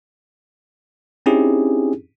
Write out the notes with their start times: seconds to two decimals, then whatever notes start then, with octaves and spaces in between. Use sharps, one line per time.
1.26 C4 C#4 D#4 E4 G4 G#4